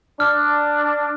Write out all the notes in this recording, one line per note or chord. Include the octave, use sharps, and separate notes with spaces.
D4 F6